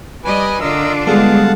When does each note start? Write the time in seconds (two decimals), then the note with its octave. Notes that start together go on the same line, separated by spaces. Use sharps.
0.24 G3 B4 D5 D#5 G#5
0.61 D3 D4 F4 A#4 D#5 E6
1.07 G3 G#3 B3 A4 F5 F#5 A5